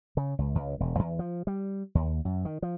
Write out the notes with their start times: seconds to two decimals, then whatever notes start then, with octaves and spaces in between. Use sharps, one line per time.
0.17 C#3
0.39 C#2
0.55 C#2
0.80 E1
0.99 E2
1.19 F3
1.47 G3
1.95 D#2
2.25 F#2
2.45 D#3
2.62 F3